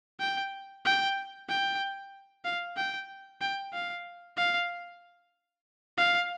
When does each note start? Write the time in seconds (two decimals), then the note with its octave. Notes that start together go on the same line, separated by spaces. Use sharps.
0.20 G5
0.85 G5
1.49 G5
2.45 F5
2.76 G5
3.41 G5
3.73 F5
4.37 F5
5.98 F5